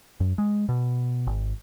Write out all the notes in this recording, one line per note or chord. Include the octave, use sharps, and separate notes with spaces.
F#2
G#3
B2
G#1